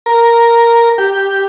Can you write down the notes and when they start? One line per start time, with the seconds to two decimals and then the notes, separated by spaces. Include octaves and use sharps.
0.06 A#4
0.98 G4